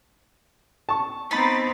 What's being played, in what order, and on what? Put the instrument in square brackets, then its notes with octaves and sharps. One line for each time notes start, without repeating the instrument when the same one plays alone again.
[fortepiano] A5 C#6
[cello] B3 C4 [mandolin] D#4 [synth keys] B5 A6 B6